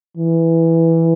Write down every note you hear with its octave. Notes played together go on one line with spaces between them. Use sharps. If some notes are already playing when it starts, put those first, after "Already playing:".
E3